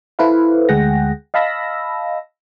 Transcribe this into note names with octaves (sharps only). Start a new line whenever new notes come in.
E4 A4 B4 C5 F5
D2 G#3 G#4 F#5 G5 A#6
D#5 F5 A5 B5 E6 A#6